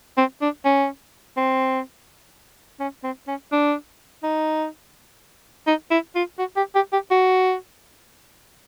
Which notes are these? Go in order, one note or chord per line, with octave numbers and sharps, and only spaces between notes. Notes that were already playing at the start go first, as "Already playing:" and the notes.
C4
D4
C#4
C4
C#4
C4
C#4
D4
D#4
D#4
E4
F4
F#4
G4
G4
G4
F#4